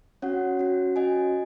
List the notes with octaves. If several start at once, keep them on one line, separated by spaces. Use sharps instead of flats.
C#4 F#4 C#5 F#5
C#4 F#4
C#4 F#4 D#5 G#5